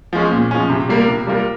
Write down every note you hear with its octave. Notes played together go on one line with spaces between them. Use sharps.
F3 G#3 C#4
A#2
F3 G#3 C#4
C3
G3 A#3 F4 A#4
C3
G3 A#3 F4 A#4